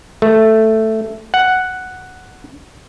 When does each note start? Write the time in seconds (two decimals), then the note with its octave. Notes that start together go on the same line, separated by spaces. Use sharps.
0.22 A3
1.34 F#5